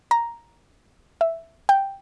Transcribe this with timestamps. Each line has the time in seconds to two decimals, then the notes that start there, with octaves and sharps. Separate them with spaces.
0.11 A#5
1.21 E5
1.69 G5